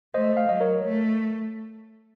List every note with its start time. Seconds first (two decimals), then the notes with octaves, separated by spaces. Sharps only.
0.14 A3 C5 D#5
0.37 F5
0.49 F#3 D#5
0.60 A#4 C#5
0.84 A3